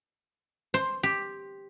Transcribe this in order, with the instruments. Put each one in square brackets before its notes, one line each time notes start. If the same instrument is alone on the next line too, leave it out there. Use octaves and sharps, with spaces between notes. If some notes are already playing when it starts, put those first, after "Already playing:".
[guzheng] C5
G4